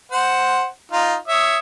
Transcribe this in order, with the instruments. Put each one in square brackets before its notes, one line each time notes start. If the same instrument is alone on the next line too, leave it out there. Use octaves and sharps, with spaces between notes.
[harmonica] C5 F#5
D#4 F4
C#5 E5 D#6